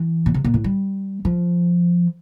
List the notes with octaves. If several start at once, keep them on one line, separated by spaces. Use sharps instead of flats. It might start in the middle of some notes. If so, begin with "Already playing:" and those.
Already playing: E3
A#2
C3
A#2
A2
G3
F3